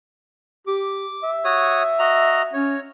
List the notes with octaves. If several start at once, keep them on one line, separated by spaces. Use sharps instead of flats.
G4 D6
E5
F#4 C#5 D#6
F#4 D#5 A#5
C#4 C#5